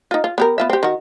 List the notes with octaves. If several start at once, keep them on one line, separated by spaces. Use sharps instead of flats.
D#4 F4
F4
B3 G4 A#4
B3 F4 E5
C4 G4
D#3 F#4